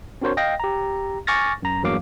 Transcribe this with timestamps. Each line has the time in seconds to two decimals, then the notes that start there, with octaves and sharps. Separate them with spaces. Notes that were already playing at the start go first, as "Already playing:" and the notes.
0.22 C4 D4 F#4 A#4 C5 C#5
0.37 D#5 F5 G5 A#6
0.60 G4 A#5
1.27 G#5 C#6 D6 F6 A6 A#6
1.62 F#2 A#5
1.83 E2 G2 F#3 A#3 F5 D6